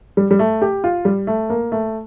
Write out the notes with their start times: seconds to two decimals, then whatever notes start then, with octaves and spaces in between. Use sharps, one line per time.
0.17 G3
0.31 G3
0.39 A3
0.62 G4
0.84 F4
1.05 G3
1.27 A3
1.50 A#3
1.72 A3